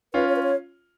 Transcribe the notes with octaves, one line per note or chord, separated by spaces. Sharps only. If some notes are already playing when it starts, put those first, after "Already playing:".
C#4 F4 B4
C#5
B4
C#5